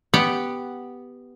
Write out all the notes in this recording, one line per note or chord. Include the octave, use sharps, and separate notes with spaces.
B3 G4 F#5 G5